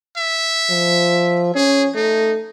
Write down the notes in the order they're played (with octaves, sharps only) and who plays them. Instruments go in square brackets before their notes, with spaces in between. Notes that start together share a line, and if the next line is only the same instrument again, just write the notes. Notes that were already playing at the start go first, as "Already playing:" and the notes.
[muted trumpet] E5
[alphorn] F3
[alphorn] C#4 [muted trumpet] G#4
[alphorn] A3 [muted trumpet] D#4